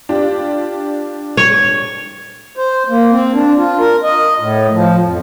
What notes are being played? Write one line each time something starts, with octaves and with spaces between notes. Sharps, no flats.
D4 F4 G4
C#5
C5
A#3
C4
D4
F4
A#4
D#5
A2
F3
F2